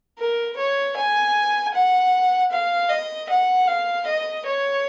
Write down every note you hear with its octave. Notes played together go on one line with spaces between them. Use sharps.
A#4
C#5
G#5
F#5
F5
D#5
F#5
F5
D#5
C#5